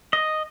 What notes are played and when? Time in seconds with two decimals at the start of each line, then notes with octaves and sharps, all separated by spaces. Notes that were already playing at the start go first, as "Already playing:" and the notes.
0.13 D#5